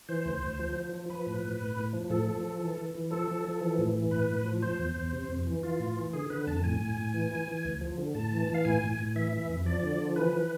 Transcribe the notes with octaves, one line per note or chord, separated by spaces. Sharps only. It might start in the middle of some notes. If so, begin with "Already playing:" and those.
E3 C5
D2
D2
F3
F3
F3
F3 B4
A2
A2
A2
A2
F3
A2 A4
F3
F3
E3
E3
E3
F3 A4
F3
F3
E3
A2
E3
A2 B4
A2
F3
F3 C5
E2
E2
C3
F2
E3
E3 F4
A2
E3
D3 G#4
D3 B4
F2 A5
A2 G#5
A2
A2
E3
E3
E3
D2
F3
D3
A2 A5
E3
E3
F5
A2 G#5
A2
A2
E3 E5
E3
F2
F3 D5
D3
F3
E3 B4
E3